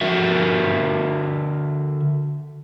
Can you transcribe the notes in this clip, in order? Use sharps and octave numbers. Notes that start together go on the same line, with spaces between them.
D3 F#4 A#4 E5